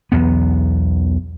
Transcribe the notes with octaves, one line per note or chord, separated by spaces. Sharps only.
B1 E2 B3